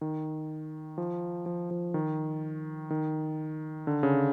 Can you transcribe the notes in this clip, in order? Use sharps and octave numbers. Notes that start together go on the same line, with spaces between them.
D#3
F3
F3
F3
D#3
D#3
D3
C#3